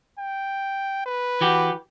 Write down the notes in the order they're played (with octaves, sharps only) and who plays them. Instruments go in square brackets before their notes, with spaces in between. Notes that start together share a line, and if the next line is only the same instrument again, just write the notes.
[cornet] G5
B4
[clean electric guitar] E3 F#4 G4